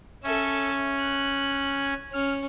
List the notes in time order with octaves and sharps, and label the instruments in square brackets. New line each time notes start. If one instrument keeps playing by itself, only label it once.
[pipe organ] C#4 [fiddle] A4 E5
[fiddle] F#6
[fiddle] C#4 [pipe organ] F6